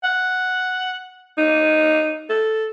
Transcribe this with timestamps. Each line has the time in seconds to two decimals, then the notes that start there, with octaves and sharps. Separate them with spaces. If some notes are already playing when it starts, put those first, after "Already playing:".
0.04 F#5
1.38 D#4
2.30 A4